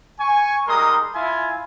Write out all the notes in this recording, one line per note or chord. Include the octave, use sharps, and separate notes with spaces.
G#5 C#6
G3 G#3 D#4 A#4 C6 D#6
E4 F4 G#5